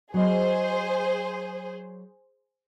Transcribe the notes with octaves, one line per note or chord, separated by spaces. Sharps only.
F#3 G#4 C5 D#5